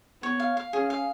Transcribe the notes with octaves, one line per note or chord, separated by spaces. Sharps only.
B3 C#5
F5
F5
C#4 G#4
F5